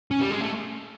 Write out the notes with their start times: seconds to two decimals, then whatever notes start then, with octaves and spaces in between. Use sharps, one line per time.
0.11 C#4
0.21 G3
0.31 G#3
0.41 A3